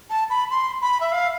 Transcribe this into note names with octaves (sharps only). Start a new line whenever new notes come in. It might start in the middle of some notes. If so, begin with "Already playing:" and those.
A5
B5
C6
B5
E5
F5